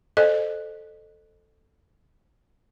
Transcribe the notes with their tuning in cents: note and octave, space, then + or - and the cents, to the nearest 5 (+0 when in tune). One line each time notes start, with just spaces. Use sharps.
A4 +0 C5 +0 D#5 -30